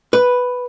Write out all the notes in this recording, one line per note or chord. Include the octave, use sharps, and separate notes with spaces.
B4